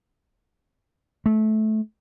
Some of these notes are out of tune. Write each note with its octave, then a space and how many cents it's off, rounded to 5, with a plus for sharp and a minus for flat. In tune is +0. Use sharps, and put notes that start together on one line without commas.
A3 -20